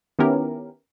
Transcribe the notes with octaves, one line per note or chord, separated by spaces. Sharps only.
D#3 B3 C#4 E4 G4 A#4